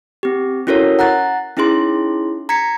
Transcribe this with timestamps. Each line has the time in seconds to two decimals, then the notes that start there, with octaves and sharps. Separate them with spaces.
0.23 C4 G4
0.67 C#4 E4 F#4 A4 A#4 C#5
0.99 F#5 A#5 F#6 A6
1.57 C#4 D#4 E4 G#4 C6
2.49 A#5 G#6 B6 C#7